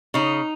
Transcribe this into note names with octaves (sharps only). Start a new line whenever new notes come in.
C#3 D#4